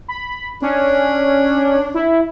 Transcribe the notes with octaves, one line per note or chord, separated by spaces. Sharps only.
B5
C#4 D4
E4